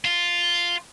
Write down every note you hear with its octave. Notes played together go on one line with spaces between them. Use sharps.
F4